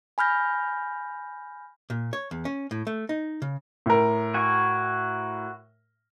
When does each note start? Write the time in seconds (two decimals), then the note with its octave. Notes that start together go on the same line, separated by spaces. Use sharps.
0.18 G#5 B5 F6 G6 A#6
1.90 A#2
2.13 C#5
2.31 E2
2.45 C#4
2.71 A2
2.87 A3
3.09 D#4
3.42 C#3
3.86 A2 A#4
4.34 F#4 G#5 C#6